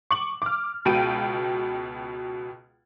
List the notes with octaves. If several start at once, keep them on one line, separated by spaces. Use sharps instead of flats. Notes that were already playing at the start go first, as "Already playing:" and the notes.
C#6 D6 F#7
D6 F6
C#2 B2 G5 D7 D#7